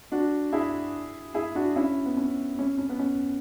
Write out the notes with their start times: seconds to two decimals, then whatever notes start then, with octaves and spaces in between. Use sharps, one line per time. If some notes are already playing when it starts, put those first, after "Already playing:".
0.12 D4 F#4
0.52 E4 G#4
1.34 E4 G#4
1.55 D4 F#4
1.76 C#4 E4
2.05 B3
2.17 C#4
2.59 C#4
2.78 C#4
2.89 B3
2.99 C#4